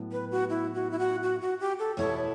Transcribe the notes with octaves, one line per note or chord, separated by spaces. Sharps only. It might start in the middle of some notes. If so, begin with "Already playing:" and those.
Already playing: A2 F#3 B3
B4
F#4
E4
F#4
E4
F#4
F#4
F#4
G4
A4
E2 B2 A3 E4 A4 C#5